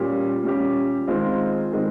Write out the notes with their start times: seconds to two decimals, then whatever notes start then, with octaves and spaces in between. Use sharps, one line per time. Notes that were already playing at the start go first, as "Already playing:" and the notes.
Already playing: A#2 G3 C#4 G4
0.43 A#2 G3 C#4 G4
1.07 D#3 G#3 C4 F4
1.72 D#3 G#3 C4